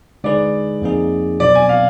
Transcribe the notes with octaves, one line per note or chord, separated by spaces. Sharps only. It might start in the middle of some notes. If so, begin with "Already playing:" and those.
D3 G#3 D#4 G#4 B4 D5
F2 F3 A#3 D#4 G#4
B2 F#3 D4 D5
G#5
F5